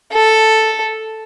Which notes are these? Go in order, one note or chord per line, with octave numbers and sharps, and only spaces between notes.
A4